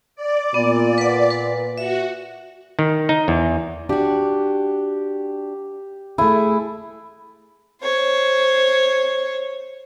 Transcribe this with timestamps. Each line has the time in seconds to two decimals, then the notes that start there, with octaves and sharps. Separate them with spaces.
0.16 D5
0.54 A#2 B3
0.98 B4 F#5
1.30 B4
1.78 F#4 E5
2.79 D#3
3.09 D#4
3.28 E2
3.89 D4 F#4 G4
6.18 A3 E4 G#4
7.82 C5 C#5